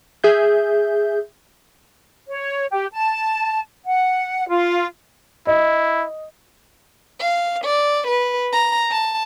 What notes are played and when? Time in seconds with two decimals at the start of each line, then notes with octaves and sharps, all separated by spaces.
0.24 G#4 E5 G6
2.28 C#5
2.71 G4
2.92 A5
3.86 F#5
4.49 F4
5.47 E4 D#5
7.21 F5
7.64 D5
8.07 B4
8.53 A#5
8.91 A5